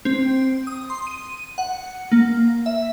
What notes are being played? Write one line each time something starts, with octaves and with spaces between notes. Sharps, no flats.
C4
D#6
C6
D#7
F#5
A#3
E5